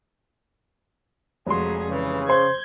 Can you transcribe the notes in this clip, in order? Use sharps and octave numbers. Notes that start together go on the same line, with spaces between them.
F1 F2 F#3 G#3 G#4 C6
C#3 E3
C5 C6 G6 G#6